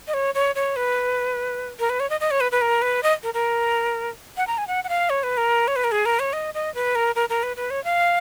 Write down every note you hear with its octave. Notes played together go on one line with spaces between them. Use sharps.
D#5
C#5
C#5
C#5
B4
A#4
B4
C#5
D#5
D#5
C#5
B4
B4
A#4
B4
D#5
A#4
A#4
F#5
A#5
G#5
F#5
F#5
F5
C#5
B4
A#4
C#5
B4
A#4
G#4
A#4
C#5
D#5
D#5
B4
A#4
A#4
A#4
B4
B4
C#5
F5